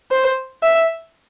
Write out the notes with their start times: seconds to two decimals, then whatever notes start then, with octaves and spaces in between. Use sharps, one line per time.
0.11 C5
0.63 E5